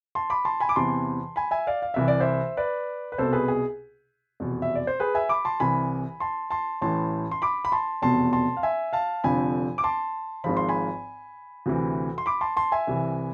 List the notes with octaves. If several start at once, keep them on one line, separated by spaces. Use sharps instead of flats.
A5 C6
B5 D6
A5 C6
G#5 B5
D6
E2 C3 E3 A5 C6
G#5 B5
E5 G#5
D5 F5
F5
C2 C3 E3 E5
D5
C5 E5
B4 D5
B4
C2 B2 A4 C5
G#4 B4
G#4
F1 E2 B2
E5
D5
C5
G#4 B4
E5 G#5
B5 D6
A5 C6
C2 C3 E3 G#5 B5
A5 C6
A5 C6
A1 A2 E3 A5 C6
C6
B5 D6
B5
A5 C6
F1 E2 B2 A5 C6
A5 C6
F5
E5 G#5
F5 A5
F1 F2 D3 F3 G#5 B5
D6
A5 C6
G#1 G#2 F3 B5
C6
G#5 B5
D2 C3 E3
C6
B5 D6
A5 C6
A5 C6
E5 G#5
C2 C3 E3